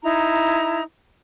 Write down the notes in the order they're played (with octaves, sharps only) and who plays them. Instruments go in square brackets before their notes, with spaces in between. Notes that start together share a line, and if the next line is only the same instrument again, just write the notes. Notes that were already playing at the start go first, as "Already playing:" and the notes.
[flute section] D#4 E4 A#5